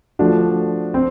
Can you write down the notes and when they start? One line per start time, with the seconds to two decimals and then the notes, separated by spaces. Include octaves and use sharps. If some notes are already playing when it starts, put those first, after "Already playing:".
0.19 F3 A3 D4 F#4
0.94 C4